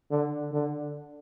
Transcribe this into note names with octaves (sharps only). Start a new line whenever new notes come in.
D3
D3